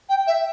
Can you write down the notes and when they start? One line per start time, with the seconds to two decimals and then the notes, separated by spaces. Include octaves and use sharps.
0.09 G5
0.27 E5